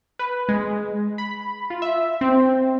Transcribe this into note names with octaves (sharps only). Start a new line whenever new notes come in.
B4
G#3
B5
F4
E5
C4